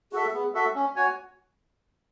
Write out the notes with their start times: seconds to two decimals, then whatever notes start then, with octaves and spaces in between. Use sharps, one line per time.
0.12 F#4 G#4 A4 E5
0.34 B3
0.54 F#4 A4 E5
0.75 C#4
0.96 F#4 C#5 G#5